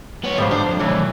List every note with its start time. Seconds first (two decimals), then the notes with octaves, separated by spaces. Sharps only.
0.24 B3 C#5
0.38 G#2 F3 G3 C5
0.51 D4 C5
0.66 F2
0.79 B1 D#3 E3 C#5